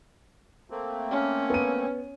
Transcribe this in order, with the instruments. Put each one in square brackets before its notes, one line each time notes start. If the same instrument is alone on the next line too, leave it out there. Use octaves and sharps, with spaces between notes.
[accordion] A3 A#3 C4
[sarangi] C#4
[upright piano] B3 D#7